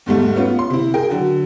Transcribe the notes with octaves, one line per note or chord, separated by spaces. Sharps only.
E2 G#2 G3 A3
B3 C#4 F4
C6
C3 E4
G#4 A#4 G5
D3 F#3